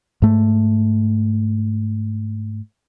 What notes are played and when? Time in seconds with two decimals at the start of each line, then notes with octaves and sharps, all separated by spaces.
0.22 G#2 A3